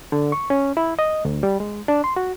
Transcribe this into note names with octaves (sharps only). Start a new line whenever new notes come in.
D3
C#6
C#4
E4
D#5
D2
G3
G#3
D4
C6
F#4